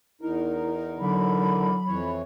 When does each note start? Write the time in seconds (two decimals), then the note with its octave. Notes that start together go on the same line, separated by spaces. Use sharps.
0.21 E2 D#4 E4 A#4
0.99 D3 F#3 B5
1.87 F2 E3 C#5